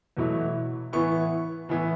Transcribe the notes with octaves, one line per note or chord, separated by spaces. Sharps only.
E2 B2 F#3 A3 E4
A2 E3 B3 E4 C#6
A2 E3 B3 E4